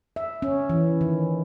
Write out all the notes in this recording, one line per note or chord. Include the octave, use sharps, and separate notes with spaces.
E5
C#4
E3
D#3